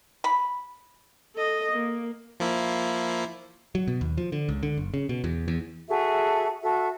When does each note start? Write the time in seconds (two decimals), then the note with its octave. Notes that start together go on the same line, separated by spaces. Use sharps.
0.24 B5
1.35 A4 D#5
1.72 A#3
2.40 F3 A#3 E4
3.75 F#3
3.88 B2
4.01 D#2
4.18 F3
4.32 D3
4.49 C#2
4.63 D3
4.77 F#1
4.94 C#3
5.09 B2
5.24 E2
5.48 E2
5.88 F#4 G#4 A4 E5
6.63 F#4 A4 E5